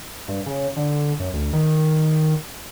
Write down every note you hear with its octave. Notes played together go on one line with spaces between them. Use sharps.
G2
C#3
D3
F#2
D2
D#3